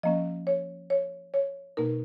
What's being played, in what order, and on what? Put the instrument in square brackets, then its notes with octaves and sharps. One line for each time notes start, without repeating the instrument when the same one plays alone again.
[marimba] F3 A#3 C#4 D#5
C#5
C#5
C#5
B2 A#3 D#4 A#4